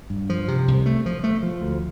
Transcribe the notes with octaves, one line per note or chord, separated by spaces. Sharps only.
G2
F3
C3
C2
A3
F3
A3
F3
D2